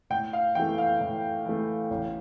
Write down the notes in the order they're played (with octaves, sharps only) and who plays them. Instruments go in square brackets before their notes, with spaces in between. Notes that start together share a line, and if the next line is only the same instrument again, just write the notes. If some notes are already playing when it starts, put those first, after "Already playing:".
[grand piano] A2 [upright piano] G5
[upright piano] F5
[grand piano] E3 A3 [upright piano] G5
[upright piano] F5
[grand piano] A2
E3 A3
A1